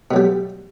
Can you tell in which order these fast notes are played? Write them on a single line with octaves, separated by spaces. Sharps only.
B2 F#3 G3